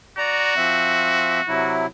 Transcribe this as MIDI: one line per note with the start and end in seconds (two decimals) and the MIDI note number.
0.18 1.77 66
0.18 0.54 74
0.18 0.54 82
0.57 1.41 53
0.57 1.41 60
0.57 1.41 76
1.48 1.87 48
1.48 1.87 54
1.48 1.87 64